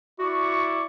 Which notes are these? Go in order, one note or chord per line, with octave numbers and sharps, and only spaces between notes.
E4 F#4 D5 C#6